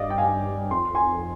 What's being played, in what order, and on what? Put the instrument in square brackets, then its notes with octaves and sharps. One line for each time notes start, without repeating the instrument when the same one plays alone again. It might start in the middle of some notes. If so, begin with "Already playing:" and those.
Already playing: [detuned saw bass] G2 [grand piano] D5 D#5 F5
[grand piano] G5
F5 G#5
[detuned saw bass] F2 [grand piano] C6
[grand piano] G#5 C6